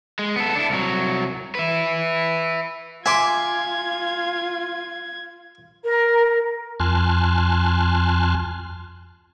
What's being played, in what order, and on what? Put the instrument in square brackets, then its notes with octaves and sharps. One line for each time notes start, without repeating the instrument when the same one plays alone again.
[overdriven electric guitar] G#3
B3 A4
D4 E4
C2 F#3
B4 E5
[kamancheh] F4 [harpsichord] E5 C6 [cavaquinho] G#5 D6 [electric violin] G#6
[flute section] A#4
[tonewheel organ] F2 G#5 A5 C6 F6 F#6